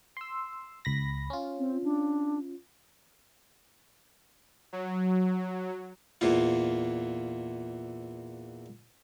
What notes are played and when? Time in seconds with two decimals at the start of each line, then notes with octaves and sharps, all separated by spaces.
0.17 C6 E6
0.85 C#2 B5 A#6
1.30 C#4 F4
1.59 C4
1.84 D4
4.73 F#3
6.21 E2 A#2 F4